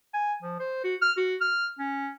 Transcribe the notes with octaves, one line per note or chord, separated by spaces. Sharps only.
G#5
F3
C5
F#4
F6
F#4
F6
C#4